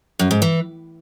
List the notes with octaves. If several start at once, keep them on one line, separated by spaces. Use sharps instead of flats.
F#2
G#2
E3